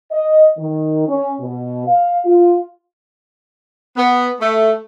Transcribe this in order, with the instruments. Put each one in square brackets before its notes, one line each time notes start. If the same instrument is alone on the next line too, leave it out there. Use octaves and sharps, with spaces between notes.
[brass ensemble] D#5
D#3
C#4
B2
F5
F4
[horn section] B3
A3